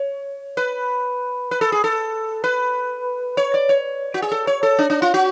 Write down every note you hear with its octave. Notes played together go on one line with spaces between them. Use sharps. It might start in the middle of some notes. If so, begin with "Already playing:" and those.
Already playing: C#5
B4
B4
A4
G#4
A4
B4
C#5
D5
C#5
F#4
G#4
A4
C#5
A4
D4
D4
F4
F#4